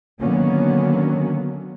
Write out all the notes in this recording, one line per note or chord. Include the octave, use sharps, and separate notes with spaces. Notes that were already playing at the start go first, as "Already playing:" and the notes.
D3 D#3 F#3 A#3 B3 C#4